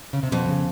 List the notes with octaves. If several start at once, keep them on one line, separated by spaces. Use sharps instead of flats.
C#3
C3
F2 B2
C#3